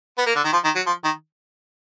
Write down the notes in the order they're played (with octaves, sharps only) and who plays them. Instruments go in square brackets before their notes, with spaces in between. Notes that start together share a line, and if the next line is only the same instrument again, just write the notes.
[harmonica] B3
A#3
D3
D#3
F3
D#3
F#3
F3
D#3